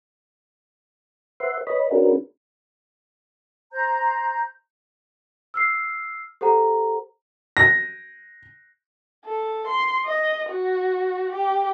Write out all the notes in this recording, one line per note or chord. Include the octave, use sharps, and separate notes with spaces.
B4 C5 E5 F#5 C6
B4 C#5 D#5 B5
C#4 D4 F#4 G#4 A#4 B4
C5 A#5 G6
E6 F6 C7
G4 A4 C5 F#5 A#5
A#6
A4
C6
D#5
F#4
G4